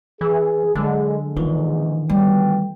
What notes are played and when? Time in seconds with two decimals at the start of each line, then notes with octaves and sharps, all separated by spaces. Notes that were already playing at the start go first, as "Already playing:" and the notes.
0.21 E3 G#4
0.75 D3 F#3 G#3
1.37 A#1 E2 G#2 D#3 E3 F4
2.10 D2 G3 B3 G5